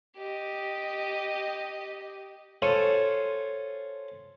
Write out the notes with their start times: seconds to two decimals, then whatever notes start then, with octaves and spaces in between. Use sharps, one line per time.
0.17 G4 D#5
2.62 F4 A4 C5 C#5 G#5